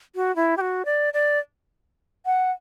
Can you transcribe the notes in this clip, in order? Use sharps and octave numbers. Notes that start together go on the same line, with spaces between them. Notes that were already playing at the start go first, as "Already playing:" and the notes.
F#4
E4
G4
F#4
D5
D5
F#5